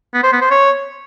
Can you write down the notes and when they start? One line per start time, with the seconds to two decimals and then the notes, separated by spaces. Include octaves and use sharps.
0.14 B3
0.23 C5
0.32 B3
0.42 C5
0.51 C#5